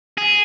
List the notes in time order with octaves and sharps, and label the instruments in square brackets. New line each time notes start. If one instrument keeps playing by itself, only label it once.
[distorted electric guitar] G#4